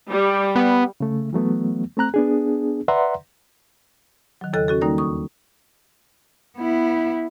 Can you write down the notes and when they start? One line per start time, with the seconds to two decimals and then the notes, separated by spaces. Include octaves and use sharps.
0.11 G3
0.56 B3
1.00 C#3 A3
1.33 E3 F#3 A3 B3
1.97 A3 C4 A#5 F#6
2.14 B3 D4 G#4
2.88 B4 D5 E5 F#5 A#5 C6
4.41 D#3 F#3
4.53 E2 C#3 A4 D#5 F#6
4.68 C#4 F#4 A4
4.81 D#3 G3 A#3 D#4 A#4 D5
4.98 D#2 C#6 D#6
6.58 B3 E4